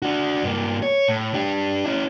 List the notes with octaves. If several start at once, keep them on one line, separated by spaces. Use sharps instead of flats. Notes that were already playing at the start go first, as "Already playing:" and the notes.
D4 F#4
G2 A#3
C#5
A2
D4 G4
C#4 E4